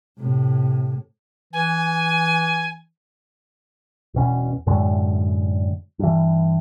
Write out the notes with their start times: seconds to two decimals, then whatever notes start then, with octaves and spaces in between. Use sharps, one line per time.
0.19 A2 C3
1.53 E3 G#5
4.14 E1 B2 C#4
4.67 F#2 A2 D3 G#3
5.99 G2 E3